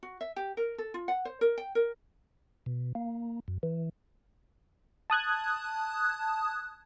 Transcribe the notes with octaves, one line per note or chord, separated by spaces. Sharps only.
F#4
E5
G4
A#4
A4
F4
F#5
C5
A#4
G5
A#4
B2
A#3
F#2
E3
A5 D#6 F#6 G#6